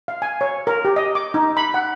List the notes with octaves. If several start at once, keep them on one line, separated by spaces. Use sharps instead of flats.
F5
G#5
C#5
A#4
G4
D#5
D6
D#4
B5
F#5